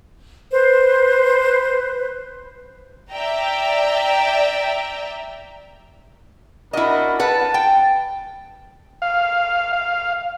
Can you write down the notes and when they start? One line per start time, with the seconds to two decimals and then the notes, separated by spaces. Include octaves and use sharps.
0.52 B4 C5
3.11 D5 E5 G5 A#5
6.73 D4 E4 F#4 A#4 D#5
7.20 B4 F#5 A5
7.54 G5
9.02 F5
9.73 F5